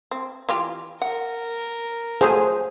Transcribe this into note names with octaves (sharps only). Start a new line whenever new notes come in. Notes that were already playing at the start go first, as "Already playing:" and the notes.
C4
E3 F4 G4
A#4 F#5
F3 F#3 A3 G#4 C5